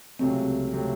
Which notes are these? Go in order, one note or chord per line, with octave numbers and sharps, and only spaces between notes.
C#2 C3 F#3 A3 C4
C3 F#3 A3